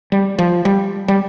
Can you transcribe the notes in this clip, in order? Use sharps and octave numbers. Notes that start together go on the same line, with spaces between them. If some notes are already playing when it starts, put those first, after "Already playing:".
G3
F3
G3
G3